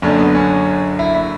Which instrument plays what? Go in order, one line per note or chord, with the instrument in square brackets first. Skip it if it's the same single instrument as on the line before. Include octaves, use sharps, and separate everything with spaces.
[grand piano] F#1 F#2 D3 C#4
B3
C#4
E4
E4